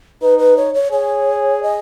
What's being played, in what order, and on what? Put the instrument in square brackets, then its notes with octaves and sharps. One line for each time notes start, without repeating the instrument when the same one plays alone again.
[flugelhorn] D#4 [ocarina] B4
[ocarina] B4
C#5
C#5
[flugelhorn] G#4 [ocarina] C#5
[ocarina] D#5